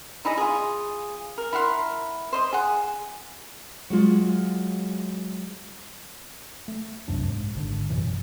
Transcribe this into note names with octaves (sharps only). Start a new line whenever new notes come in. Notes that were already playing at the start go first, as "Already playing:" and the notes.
D#4 E4 G#4 D#5
F4 G#4
A#4
E4 A#4 F#5 C6
C5 D#5 C6
G#4 F#5
F#3 G#3 F4 G#4
A3
F1 C2 F#2 D4
G#2
G#1 D3
A1 F#2 B2 E3